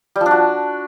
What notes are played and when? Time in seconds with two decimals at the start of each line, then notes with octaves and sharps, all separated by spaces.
0.16 G3
0.21 F3
0.26 D4
0.31 F#4